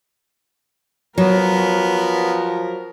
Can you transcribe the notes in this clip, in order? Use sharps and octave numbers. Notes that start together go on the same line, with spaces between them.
F3 F#3 B3 A#4